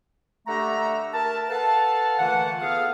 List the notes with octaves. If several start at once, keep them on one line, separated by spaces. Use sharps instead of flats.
D3 A3 G4 E5 F#5 A#5
A#4 E5 A5
A4 B4 F5 F#5 A5
A#2 D3 E3 A3 F#5
E3 B3 G#4 A4 F5